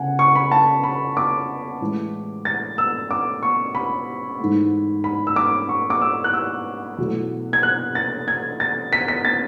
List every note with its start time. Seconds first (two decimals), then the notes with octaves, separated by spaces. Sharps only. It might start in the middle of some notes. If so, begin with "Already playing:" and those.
Already playing: C#3 F#5 G#5
0.19 C#6
0.36 B5
0.52 A5
0.84 B5
1.17 D6
1.81 A2 E3 G#3
2.45 A6
2.78 E6
3.11 D6
3.43 C#6
3.75 B5
4.39 G#2 E3 A3
5.04 B5
5.27 E6
5.36 D6
5.69 C#6
5.90 D6
6.01 E6
6.24 F#6
6.33 E6
6.98 E2 B2 F#3 A3
7.53 G#6
7.63 F#6
7.95 A6
8.28 G#6
8.60 A6
8.93 B6
9.08 B6
9.25 A6